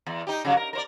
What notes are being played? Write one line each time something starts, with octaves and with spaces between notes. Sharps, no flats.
E2
D#4 G4
C#3 F#3
A#4
A#4 C5 D5